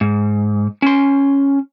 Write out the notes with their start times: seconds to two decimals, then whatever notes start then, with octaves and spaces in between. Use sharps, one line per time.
0.01 G#2
0.82 C#4 C6